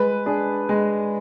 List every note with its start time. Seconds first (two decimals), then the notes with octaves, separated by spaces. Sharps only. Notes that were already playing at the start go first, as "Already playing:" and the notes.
Already playing: G#3 B4
0.26 D4 G#4 D5
0.69 G#3